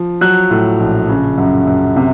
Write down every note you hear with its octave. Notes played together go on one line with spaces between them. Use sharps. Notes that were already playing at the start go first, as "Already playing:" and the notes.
Already playing: F3
F#3 F#6
A2
A#1
C#3
F#2
F#2
C3